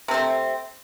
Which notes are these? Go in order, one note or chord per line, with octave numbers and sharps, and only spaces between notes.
C3 A3 C4